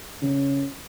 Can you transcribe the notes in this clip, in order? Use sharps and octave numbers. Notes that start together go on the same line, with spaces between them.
C#3